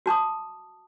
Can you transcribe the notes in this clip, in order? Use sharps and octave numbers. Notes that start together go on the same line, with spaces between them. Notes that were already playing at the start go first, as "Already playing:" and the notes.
F#4 A5 D6 D#6